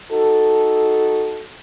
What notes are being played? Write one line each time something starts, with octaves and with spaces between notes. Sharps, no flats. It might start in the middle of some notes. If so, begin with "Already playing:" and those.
D#4 F#4 A4